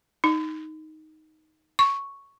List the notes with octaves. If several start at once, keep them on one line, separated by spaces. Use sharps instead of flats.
D#4
C#6